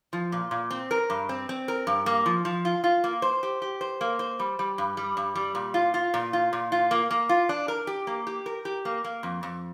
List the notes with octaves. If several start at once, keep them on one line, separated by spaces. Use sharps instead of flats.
F3
A#2
A#2
C4
A#4
G2
C4
C4
A#4
G2
A#3
F3
F3
F4
F4
A#3
C5
G4
G4
C5
A#3
C5
G3
G3
G2
G3
G2
G3
A#2
F4
F4
A#2
F4
A#2
F4
A#3
A#3
F4
D4
A#4
G4
A#3
G4
A#4
G4
A#3
A#3
F2
F2